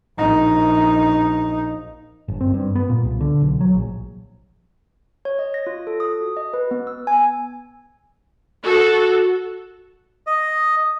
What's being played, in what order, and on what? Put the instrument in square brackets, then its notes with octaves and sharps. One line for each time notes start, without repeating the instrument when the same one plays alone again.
[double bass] A#1 D#4
[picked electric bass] G1
C4
G2
B3
A#2
C2
D3
B1
F#3
A#1
[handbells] C#5
D#5
A#6
F4
A4
D#6
F#4
D#5
B4
B3
E6
G#5
[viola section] F#4 A4
[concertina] D#5